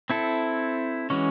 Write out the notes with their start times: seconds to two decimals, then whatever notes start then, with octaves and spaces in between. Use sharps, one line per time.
0.10 C4 E4 A4
1.10 E3 G#3 C#4 F#4